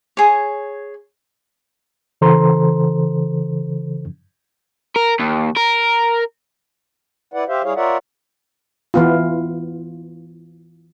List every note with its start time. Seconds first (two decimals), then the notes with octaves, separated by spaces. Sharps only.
0.17 G#4 C#5
2.21 C#3 E3 A4 C5 A#5 C6
4.96 A#4
5.19 D#2
5.56 A#4
7.34 E4 B4 D5 F#5
7.48 G4 C5 E5 F5
7.64 G3 E4 G#4 C#5 F5
7.76 F4 A#4 C#5 D5 E5 F#5
8.94 E3 B3 F4